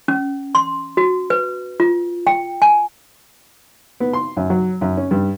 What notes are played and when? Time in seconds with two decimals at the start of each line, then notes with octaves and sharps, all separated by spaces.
0.08 C#4
0.55 C6
0.97 F#4
1.30 B4
1.80 F4
2.27 G5
2.62 G#5
4.00 B3
4.13 C6
4.37 F#2
4.50 F#3
4.81 F#2
4.97 C#4
5.11 G2